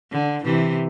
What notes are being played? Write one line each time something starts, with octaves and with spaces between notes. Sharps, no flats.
D3
C3 E3